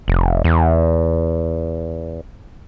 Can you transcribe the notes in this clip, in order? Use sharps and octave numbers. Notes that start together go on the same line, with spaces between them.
F1
E2